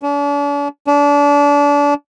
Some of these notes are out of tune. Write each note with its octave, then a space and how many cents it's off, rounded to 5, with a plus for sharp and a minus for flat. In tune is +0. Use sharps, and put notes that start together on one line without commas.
D4 -45
D4 -30